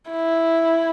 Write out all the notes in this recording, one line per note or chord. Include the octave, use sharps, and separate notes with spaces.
E4